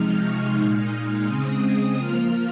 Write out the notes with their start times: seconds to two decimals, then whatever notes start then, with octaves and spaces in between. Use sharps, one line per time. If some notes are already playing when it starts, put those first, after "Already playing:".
Already playing: C3 F3 G#3 D#4 F6
0.22 C#6
0.56 A#2 G#3 D#4 F6
1.27 C#3 G#3 C4 D#6
1.62 D#6
1.97 F3 A#3 F4 F6